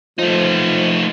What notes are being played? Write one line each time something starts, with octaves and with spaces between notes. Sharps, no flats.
F3 A3 D#4